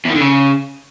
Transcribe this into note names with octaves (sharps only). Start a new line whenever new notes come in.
E2
D#3
D3
C#3